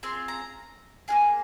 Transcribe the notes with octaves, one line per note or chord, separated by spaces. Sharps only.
C4 F4 G#4 C6
A#5
A#3 F4 G#4 G#5